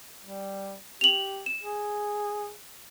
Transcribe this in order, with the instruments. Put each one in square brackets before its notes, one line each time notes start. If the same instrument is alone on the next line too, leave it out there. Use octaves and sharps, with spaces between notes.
[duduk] G3
[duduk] G4 [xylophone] F7 F#7
[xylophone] E7
[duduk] G#4